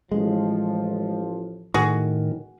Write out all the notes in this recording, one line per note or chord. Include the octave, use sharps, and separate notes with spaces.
A1 F3 G#3
A2 D#3 F#4 G#4